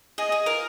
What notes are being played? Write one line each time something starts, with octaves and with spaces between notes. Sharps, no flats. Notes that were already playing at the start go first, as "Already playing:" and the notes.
G#4 D#5
G#4
F4 A#4